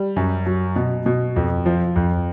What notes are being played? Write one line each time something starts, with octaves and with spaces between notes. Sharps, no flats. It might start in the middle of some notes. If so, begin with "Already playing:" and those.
Already playing: G3
F#2
F#3
B2
B2
F2
F3
F2